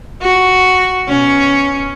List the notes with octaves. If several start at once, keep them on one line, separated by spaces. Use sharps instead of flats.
F#4
B2 C#4